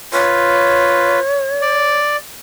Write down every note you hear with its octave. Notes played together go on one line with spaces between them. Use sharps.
F4 B4 C#5
D5